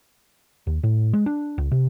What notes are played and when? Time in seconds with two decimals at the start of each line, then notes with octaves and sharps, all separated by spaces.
0.67 D#2
0.83 A2
1.13 G#3
1.26 D4
1.58 C#2
1.71 C3